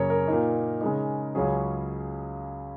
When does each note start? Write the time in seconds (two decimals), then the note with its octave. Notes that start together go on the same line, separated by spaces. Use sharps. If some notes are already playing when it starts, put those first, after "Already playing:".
Already playing: F#2 C#3 A#3 C#5 A#5
0.10 A#4
0.28 A#2 A#3 D#4
0.81 C#3 G#3 D#4
1.35 C#2 C#3 F#3 C#4 G#4